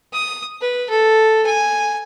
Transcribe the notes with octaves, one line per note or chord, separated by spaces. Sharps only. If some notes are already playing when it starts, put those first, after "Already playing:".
D#6
B4
A4
G#5